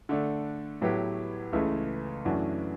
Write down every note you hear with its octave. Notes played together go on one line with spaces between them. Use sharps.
D3 A3 D4
A2 F#3 B3 E4 G4
C#2 C#3 E3 A3
F#2 E3 A3 D4 F#4